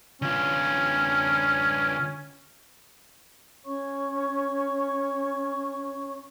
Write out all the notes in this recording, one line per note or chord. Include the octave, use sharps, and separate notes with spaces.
D3 C#4 F4
C#4 C#5 C#6